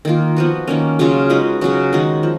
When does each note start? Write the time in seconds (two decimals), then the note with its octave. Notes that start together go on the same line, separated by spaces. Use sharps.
0.05 D#3 A#3 F4
0.36 F3 B3 F#4
0.67 D#3 A#3 C#4
0.99 C#3 F#3 C#4 F4
1.30 G#3 D#4 F#4 B4
1.61 C#3 F#3 C#4 F#4
1.93 D#3 G#3 D#4 F#4
2.23 F3